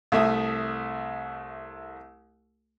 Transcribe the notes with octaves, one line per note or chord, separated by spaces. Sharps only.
C2 A3 E5 D#6